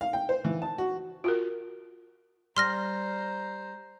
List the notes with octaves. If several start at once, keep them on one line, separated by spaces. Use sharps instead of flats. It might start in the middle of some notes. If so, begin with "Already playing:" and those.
F5
G5
C5
E3
A5
F#4
F4 F#4 A#4
G3 C5 A#5 C6 F6 A#6